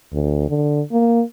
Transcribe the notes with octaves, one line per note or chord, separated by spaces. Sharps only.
D2
D3
A#3